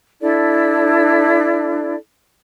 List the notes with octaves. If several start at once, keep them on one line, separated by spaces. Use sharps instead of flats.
D4 E4 A4 D5